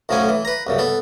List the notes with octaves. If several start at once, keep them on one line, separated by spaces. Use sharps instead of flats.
B1 A2 F3 F#3 C#4 G#5
E3
B4 A#5
C2 F#2 C#3
B3 A4